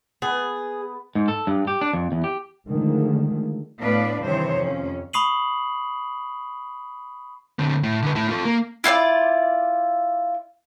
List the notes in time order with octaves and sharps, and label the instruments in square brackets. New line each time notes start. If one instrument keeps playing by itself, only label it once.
[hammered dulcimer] B3 [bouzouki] G#4
[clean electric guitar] G#2
A4
G2
G4
D4
F2
E2
G4
[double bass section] D3 D#3 F3 G#3 A3
[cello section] A2 B3 D4 B4 D5 F5
G2 C3 D#3 E3 C5 C#5
F2 C#4
[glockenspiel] B5 C#6 D#6 C7 D#7 F#7
[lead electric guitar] D3 C4
A2
D3 B4
A2 E4
F4 A4
A#3
[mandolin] E4 F4 C5 D5